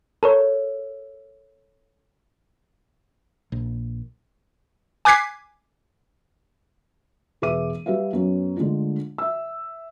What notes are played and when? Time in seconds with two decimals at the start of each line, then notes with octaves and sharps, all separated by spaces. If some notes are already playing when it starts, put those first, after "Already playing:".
0.23 A4 A#4 C#5
3.52 A#1
5.05 G#5 D6 F#6 G#6 B6 C7
7.42 E1 G#4 B4 E5 D6 D#7
7.86 G3 B4 E5 F5
8.13 F#2 B3 C#4
8.57 D3 G#3 A3 D4 F4
9.18 E5 E6